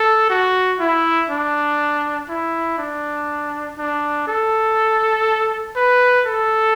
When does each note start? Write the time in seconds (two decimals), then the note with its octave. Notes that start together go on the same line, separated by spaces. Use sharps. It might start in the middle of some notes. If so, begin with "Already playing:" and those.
Already playing: A4
0.30 F#4
0.80 E4
1.30 D4
2.29 E4
2.78 D4
3.78 D4
4.27 A4
5.76 B4
6.26 A4